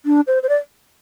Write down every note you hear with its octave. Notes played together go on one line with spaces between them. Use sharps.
D4
C5
C5
D5